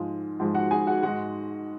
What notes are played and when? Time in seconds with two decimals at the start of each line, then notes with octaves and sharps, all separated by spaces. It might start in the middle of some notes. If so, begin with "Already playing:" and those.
Already playing: G#2 F3 G#3 F4
0.40 G#2 F3 G#3
0.55 F#4 F#5
0.71 G#4 G#5
0.87 F#4 F#5
1.03 G#2 G#3 F#4 F#5